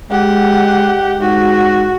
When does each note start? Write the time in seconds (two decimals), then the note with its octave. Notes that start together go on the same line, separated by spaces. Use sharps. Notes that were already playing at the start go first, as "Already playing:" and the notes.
0.11 G#3 G4 F#5
1.21 G#2 F#4